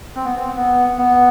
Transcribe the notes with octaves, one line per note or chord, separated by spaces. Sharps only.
C4
B3
C4
B3
B3